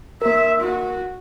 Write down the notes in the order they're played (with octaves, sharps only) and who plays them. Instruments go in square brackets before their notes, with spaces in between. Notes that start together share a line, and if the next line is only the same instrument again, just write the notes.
[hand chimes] A#3 A#4 [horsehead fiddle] E5
[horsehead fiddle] F#4